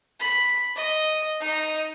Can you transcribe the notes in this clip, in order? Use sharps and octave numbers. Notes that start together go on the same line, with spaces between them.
B5
D#5
D#4